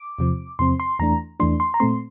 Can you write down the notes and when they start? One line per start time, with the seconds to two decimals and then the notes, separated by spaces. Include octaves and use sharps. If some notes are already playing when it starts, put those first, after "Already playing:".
Already playing: D6
0.19 E2 C3 F3 C4
0.59 E2 C3 F3 C4 C6
0.80 C6
0.99 E2 E3 A3 D4 A#5
1.40 E2 E3 A3 D4 C6
1.60 C6
1.74 A#5
1.80 A#2 A3 C4 C6